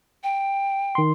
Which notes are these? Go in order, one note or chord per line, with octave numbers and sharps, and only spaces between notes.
G5
D#3 C6